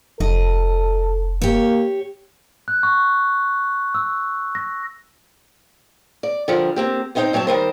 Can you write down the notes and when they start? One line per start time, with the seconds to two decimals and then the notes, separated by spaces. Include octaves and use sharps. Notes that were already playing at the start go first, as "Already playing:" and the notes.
0.20 F1 A4 D#5
1.42 A#3 G4 C#5
2.68 F#6
2.83 C#6
3.95 E6
4.55 A#6
6.23 D5
6.48 D3 F3 G3 A#4
6.76 A#3 C4 G4
7.15 B3 C4 D#4 E4 C5 G5
7.33 G2 F#3 C4 C5 A5
7.47 D#3 G3 A#4 C5